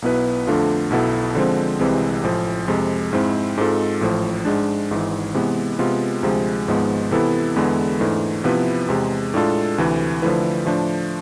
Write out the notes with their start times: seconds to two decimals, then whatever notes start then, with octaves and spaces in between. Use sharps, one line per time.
0.02 B1 B2 B3 E4 B4
0.47 F2 D3 A3 D4 F4
0.90 B1 B2 B3 E4 A4
1.35 D3 F3 G#3 C4
1.80 C2 C3 E3 G#3 C4
2.23 A1 A2 F3
2.68 F2 C3 G#3
3.13 G#2 G#3 C4 E4
3.57 G#2 G#3 C4 F4 A4
4.01 A1 A2 F3
4.45 G#2 G#3 D4
4.91 G#1 G#2 E3
5.34 C3 E3 G#3 B3
5.79 C3 G#3 B3 F4
6.23 D2 C3 F3 G#3
6.68 G#1 G#2 F3 G#3 B3
7.11 C3 E3 B3 E4 A4
7.56 E2 D3 G#3 B3 E4
8.00 G#2 E3 A3 D4
8.44 C3 F3 B3 E4 B4
8.88 E2 C3 G#3
9.34 A2 G#3 D4 F4 A4
9.78 D2 C3 E3
10.22 D3 F3 A3 E4 B4
10.66 A2 F3 A3 D4